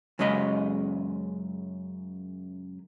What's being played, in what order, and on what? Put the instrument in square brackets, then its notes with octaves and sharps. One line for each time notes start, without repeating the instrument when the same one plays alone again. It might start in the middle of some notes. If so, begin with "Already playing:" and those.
[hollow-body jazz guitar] F#2 C#3 G#3 D#5 A#5 B5